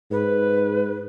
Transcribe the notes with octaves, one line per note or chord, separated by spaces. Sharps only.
G#2 B4